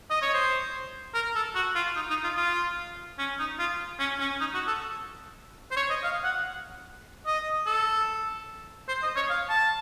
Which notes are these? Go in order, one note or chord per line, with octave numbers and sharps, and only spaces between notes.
D#5
C#5
C5
A#4
A4
F#4
F4
D#4
D#4
F4
F4
C#4
D#4
F4
C#4
C#4
D#4
F#4
A4
C5
C#5
D#5
F5
F#5
D#5
A4
C5
D#5
C#5
F5
A5